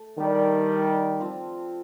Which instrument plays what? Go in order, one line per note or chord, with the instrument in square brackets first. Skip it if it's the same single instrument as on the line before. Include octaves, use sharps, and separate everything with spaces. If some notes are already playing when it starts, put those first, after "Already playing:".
Already playing: [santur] A3
[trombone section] D#3 G3 [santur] D4 G4 D5
[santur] F3 C4 F4